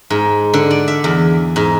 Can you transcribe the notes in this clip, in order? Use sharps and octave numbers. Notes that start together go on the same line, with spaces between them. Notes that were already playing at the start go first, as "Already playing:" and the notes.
G#2
D3
D5
E5
E2
G#2